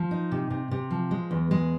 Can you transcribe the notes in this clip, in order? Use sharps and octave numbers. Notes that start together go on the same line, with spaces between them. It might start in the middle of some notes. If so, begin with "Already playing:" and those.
Already playing: F3
D#4
C3
C3
C3
F3
G#3
E2
G#3